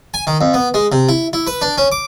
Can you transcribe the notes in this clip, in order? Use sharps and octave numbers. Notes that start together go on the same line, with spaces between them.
G#5
D#3
F2
B3
G#3
C3
E4
E4
B4
D4
C#4
D6